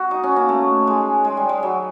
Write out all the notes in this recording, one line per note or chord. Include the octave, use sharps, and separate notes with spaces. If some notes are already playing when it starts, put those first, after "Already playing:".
Already playing: F#4
D#4
C#4
A#3
A3
G#3
G#3
G3
G#3
F#3